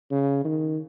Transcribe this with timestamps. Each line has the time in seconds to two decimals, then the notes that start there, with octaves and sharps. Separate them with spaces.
0.11 C#3
0.45 D#3